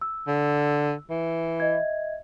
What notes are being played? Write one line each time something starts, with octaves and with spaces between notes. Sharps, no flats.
E6
D3
E3
D#5 E5 G#6